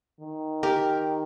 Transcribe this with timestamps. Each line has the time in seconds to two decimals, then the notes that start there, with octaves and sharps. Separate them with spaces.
0.21 D#3
0.63 G4 A#4